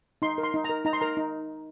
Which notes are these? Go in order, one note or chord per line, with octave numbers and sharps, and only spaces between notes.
D#4 C6
A#4
C6
D#4
A#5
A#4
D#4 A#5
C6
A#4 A#5
D#4